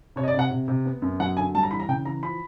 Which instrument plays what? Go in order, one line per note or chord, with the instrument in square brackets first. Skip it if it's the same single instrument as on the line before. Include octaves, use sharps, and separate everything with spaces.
[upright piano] C3 C#5
D#5
D5
C3 F#5
C3
C3
B3
F#2
F#3 F#5
D3 G#5
G3 A5
A#5
E3 B5
A#5
C#3 G5
E3 A#5
F3 B5